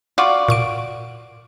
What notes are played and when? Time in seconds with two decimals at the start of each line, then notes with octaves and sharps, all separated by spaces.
0.18 F4 F#4 D5
0.48 A#2 C#6 D7